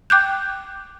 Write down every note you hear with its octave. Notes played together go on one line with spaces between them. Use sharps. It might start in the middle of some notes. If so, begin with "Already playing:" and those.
G5 D6 F#6 G6